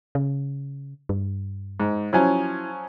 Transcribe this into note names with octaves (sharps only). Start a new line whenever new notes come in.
C#3
G2
G#2
F3 F#3 C#4 E4